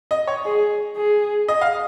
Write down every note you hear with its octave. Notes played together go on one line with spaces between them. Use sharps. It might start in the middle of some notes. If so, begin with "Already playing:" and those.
D#5
C#5
G#4
G#4
D#5
F5